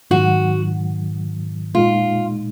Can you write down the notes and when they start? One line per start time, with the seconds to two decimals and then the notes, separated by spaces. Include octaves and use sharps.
0.11 G#2 D#3 F#3 F#4
1.75 A#2 G#3 D#4 F4